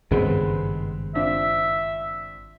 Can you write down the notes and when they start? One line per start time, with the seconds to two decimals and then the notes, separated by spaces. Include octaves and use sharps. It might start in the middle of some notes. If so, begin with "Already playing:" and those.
0.11 G#1 G2 C#3 G#3 B3 C4
1.15 C4 D4 F4 E5